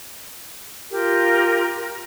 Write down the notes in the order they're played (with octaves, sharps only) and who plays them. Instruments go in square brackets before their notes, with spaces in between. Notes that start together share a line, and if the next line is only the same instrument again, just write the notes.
[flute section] F4 G4 A#4